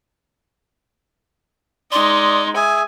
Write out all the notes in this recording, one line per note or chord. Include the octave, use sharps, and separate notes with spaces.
G#3 D#4 D5 C6
G#4 E5 G#5